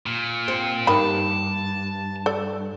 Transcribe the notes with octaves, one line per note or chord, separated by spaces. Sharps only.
A#2
C4
G2 D#3 A5 B5
A4 D5